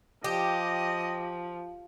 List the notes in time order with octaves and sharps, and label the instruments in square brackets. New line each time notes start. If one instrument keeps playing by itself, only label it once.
[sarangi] F3 [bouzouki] G4 [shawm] D#5